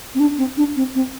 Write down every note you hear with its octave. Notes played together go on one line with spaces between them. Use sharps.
C4
D4
C4
D4
C4
C4